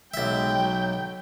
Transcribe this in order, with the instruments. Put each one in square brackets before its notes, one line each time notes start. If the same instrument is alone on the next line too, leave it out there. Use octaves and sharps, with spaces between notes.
[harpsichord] B1 E5 [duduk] G#3 [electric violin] G5
[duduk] F#3